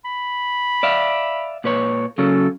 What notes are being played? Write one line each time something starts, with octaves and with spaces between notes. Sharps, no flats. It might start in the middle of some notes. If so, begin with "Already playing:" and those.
B5
D5 E5 F5
A#2 B4 C#5
C#3 F#3 C#4 A4